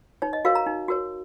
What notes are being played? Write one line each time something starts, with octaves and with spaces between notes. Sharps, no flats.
D#4 C#5
D#5
F#4 A#4 C#5 F5
A#5
D#4
F#4 A#4 C#5